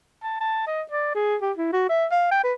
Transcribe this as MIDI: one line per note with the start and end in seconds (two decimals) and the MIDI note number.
0.23 0.37 81
0.40 0.63 81
0.67 0.82 75
0.91 1.14 74
1.15 1.36 68
1.42 1.52 67
1.57 1.69 64
1.73 1.84 66
1.89 2.06 76
2.11 2.28 77
2.32 2.42 79
2.44 2.54 71